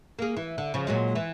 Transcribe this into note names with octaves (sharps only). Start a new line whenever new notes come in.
A#3 G#4
E3
D3
C#3 F3
A#2 F#3 G#3
E3